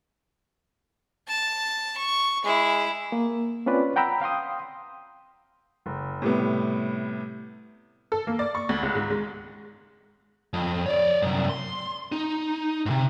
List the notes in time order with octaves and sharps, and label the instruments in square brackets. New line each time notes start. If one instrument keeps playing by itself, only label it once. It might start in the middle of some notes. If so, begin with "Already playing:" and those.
[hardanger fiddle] A5
C#6
[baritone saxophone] G#3 [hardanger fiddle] E4
[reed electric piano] A#3
C4 C#4 F4 B4 D5
F#5 G5 A#5 B5 E6
F5 G5 C6 D#6
[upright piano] F#1
A2 C3 G3 B3
[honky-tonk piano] A4
A#3
D5
C#6
D2
C#2
G#2
G#3
[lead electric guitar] F2
C#5 D5
C2 F#2
C6
D#4
G#2 C3